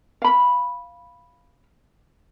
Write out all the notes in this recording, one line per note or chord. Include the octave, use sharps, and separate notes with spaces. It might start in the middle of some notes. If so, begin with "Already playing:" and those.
F5 B5